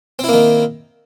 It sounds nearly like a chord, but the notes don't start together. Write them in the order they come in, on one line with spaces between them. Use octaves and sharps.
C4 E4 A#3 D#3